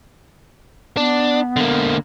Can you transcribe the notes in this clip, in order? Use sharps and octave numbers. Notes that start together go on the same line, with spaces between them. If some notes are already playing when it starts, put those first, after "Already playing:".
B3 D4
D3 A#3